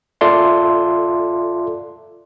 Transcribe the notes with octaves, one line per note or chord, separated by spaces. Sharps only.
F4 A4 D5 E5 C6